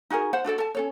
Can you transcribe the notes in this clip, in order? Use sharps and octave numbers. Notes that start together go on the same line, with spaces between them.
D#4 F#4 G#4 A#4
C5 F#5
D4 F#4 A4 D5
A4 A5
C#4 A4 C#5